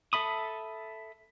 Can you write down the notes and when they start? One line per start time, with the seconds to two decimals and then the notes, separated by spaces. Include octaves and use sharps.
0.13 A4 E5 B5 D#6